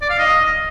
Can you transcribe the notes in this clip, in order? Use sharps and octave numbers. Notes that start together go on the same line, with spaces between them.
D5
F5
D#5